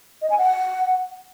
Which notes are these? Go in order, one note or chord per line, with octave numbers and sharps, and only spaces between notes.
D#5
G#5
F#5